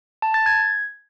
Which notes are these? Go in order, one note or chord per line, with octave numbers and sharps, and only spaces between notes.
A5
A6
G#6